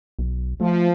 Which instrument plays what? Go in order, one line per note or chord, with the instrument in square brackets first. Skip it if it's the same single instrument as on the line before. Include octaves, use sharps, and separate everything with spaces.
[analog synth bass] B1
[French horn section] F3 [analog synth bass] A3